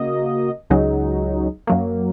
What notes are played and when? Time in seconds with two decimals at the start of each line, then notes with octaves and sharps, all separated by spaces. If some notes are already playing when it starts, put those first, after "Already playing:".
Already playing: C#3 A#3 F#4 D#5
0.70 C#2 C#3 F#3 D#4 G#4
1.67 F#2 F#3 A#3